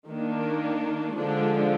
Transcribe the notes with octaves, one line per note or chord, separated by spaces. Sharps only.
D#3 A#3 D4
D3 F3 G#3 D4